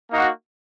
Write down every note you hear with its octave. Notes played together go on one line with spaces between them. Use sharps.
A#3 D#4 F#4